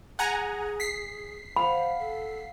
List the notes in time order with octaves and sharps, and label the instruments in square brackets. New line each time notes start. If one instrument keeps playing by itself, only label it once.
[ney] G#4 [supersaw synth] F#5 G#5 A#5
[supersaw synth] B6 C7
[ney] C5 [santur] F5 F#5 [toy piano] B5
[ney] A4